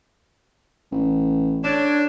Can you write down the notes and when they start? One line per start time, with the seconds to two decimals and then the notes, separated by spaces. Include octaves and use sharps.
0.92 A1
1.64 D3 D4 C#5